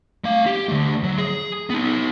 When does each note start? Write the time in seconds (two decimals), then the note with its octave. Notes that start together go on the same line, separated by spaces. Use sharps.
0.24 A3 F5
0.46 G4
0.69 D3 A3
1.03 F#3
1.18 G#4
1.70 B3 D#4